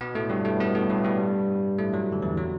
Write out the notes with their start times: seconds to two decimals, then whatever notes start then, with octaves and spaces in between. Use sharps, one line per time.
0.01 B2 B3
0.15 A2 A3
0.30 G2 G3
0.45 A2 A3
0.59 B2 B3
0.74 A2 A3
0.89 G2 G3
1.04 G2 G3
1.78 A2 A3
1.93 F#2 F#3
2.12 D3
2.22 E2 E3
2.37 F#3